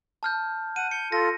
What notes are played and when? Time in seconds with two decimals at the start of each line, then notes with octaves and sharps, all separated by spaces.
0.23 A5 F6 G6
0.76 F#5 D#7
0.91 G6 C#7
1.12 F4 A4 A#6